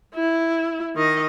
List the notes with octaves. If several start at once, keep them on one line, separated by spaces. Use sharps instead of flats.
E4
D#3 D#5